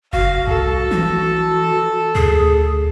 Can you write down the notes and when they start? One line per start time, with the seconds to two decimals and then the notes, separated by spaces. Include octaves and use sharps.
0.13 F#1 F#4 F5
0.47 C2 A4
0.91 E3 F#4
2.15 D2 G#4